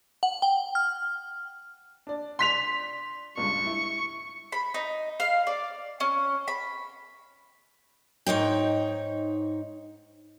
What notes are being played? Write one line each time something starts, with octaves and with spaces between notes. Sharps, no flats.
F#5
G5
F6
D4 D5
C6 B6 F7
C#2 G2 C#6
E4
B5
D#4
F5
D5
C#4
B5
G#2 D#4 C#5 G5